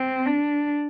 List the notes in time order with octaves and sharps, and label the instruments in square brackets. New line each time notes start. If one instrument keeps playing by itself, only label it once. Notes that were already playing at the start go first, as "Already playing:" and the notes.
Already playing: [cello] C4
D4